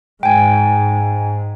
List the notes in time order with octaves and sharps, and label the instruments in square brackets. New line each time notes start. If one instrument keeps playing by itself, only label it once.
[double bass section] G#2 [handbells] G5 G#5